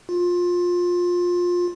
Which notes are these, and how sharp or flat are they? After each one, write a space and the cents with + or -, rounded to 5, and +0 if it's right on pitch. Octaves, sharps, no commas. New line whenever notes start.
F4 +20